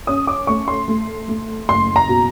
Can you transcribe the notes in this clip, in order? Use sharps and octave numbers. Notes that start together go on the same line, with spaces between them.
C#4 D#6
D6
A3 C#6
C6
A3
A3
F#1 C6
A#5
B2